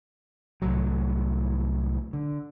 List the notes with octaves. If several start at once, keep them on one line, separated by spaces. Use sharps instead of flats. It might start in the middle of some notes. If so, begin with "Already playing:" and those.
C2 A2 F#3
D3